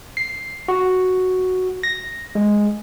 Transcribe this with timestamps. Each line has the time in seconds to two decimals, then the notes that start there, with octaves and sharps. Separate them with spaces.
0.17 C7
0.68 F#4
1.83 A#6
2.35 G#3